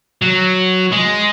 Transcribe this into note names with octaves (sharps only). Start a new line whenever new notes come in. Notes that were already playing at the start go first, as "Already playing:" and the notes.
F#3
G#3